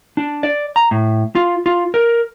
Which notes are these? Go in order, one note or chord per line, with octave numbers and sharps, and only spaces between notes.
D4
D5
A#5
A2
F4
F4
A#4